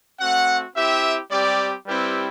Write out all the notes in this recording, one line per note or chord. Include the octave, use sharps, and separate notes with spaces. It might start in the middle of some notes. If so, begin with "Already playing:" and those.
A3 C4 F#4 F#5
C4 E4 G4 E5
G3 C4 G4 D5
G3 C4 E4 G4 B4